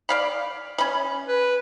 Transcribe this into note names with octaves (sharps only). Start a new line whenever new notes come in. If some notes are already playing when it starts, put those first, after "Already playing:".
D5 F5 B5
C#4 B5
B4